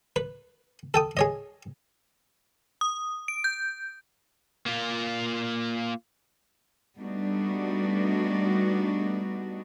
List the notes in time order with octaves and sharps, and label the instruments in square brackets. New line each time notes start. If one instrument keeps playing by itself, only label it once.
[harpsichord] B4
A4 G5 D#6
G#4 C#5 D#5
[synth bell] D#6
D7
G6
[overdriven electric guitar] A#3 F4
[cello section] G3 A3 B3 D4 D#4 F#4